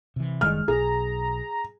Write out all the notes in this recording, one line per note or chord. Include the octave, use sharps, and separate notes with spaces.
C3 E3
F#1 D#3 G3 G#3 F6
B1 G#4 A#5